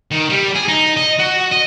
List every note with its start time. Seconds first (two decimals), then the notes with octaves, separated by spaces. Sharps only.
0.11 D#3
0.30 G3
0.55 G#4
0.69 D#4
0.98 D#5
1.19 F#4
1.52 D#5